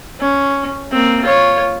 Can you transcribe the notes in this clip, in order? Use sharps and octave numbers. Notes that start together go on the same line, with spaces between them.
C#4
A#3 C4
F4 C#5